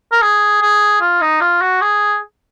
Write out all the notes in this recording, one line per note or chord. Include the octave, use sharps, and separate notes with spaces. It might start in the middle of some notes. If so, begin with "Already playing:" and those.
A#4
G#4
G#4
F4
D#4
F4
F#4
G#4